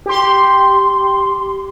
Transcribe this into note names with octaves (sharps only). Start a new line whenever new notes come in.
G4 C6